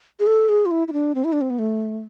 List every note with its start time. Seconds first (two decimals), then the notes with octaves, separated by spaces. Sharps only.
0.20 G#4
0.27 A4
0.49 G#4
0.66 F4
0.71 E4
0.88 E4
0.93 D4
1.15 C4
1.24 E4
1.33 D4
1.41 C4
1.50 B3
1.59 A3